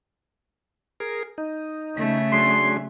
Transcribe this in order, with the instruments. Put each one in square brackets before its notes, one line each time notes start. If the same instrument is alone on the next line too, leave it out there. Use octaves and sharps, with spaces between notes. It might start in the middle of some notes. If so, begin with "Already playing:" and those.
[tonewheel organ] G#4 A#4
D#4
[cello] C#3 A3
[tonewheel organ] F#3 D4 G#4 [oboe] C6